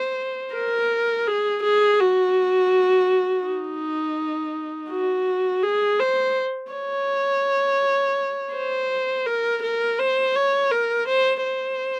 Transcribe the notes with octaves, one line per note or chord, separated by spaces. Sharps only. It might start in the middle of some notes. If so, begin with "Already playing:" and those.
Already playing: C5
A#4
G#4
G#4
F#4
D#4
F#4
G#4
C5
C#5
C5
A#4
A#4
C5
C#5
A#4
C5
C5